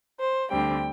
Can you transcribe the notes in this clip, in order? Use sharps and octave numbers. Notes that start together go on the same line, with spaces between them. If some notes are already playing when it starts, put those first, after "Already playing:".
C5
D2 D3 G3 C4 G5